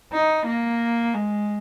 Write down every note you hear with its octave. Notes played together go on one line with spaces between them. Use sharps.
D#4
A#3
G#3